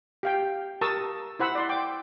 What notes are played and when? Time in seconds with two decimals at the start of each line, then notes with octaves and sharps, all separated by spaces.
0.23 G4 F5 G5
0.81 G4 A#4 A5 C#6 D#6 E6
1.39 E4 C5 F#5 B5 E6
1.55 D5 C6
1.69 G5 D6